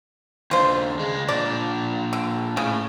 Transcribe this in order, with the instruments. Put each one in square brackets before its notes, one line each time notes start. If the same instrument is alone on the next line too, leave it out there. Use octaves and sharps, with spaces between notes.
[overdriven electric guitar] D#2 D4 [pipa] F4 C5
[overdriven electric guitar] C#2 G#3
[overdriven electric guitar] A#2 D4 [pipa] D5
[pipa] D3
[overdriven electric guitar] A2 [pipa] C#3